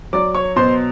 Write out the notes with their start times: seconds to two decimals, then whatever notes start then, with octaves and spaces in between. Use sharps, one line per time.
0.13 F#3 D5 D6
0.35 C#5 C#6
0.56 B2 C5 C6